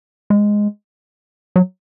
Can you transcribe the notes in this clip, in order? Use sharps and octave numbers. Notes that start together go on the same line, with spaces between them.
G#3
F#3